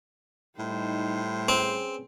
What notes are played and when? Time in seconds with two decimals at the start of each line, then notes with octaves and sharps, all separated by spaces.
0.59 A2 G3 D#4 C5
1.49 C4 C#4 G#4 B4